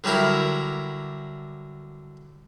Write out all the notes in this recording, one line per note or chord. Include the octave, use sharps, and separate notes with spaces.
D3 F#3 G3 E4 A#4